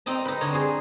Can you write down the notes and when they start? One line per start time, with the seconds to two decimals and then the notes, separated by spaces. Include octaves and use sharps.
0.06 C4 D#4 D#5 A#5
0.25 D#4 B4
0.41 D3 D#4 C#5 D#5
0.52 G#4 C5